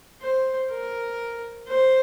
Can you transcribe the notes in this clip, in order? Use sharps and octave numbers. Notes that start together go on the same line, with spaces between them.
C5
A#4
C5